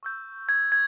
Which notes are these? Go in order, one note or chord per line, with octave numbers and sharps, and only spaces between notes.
C#6 E6 G6
G#6
G#6